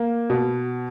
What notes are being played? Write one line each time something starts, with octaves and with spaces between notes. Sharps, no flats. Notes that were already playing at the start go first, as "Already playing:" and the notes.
Already playing: A#3
B2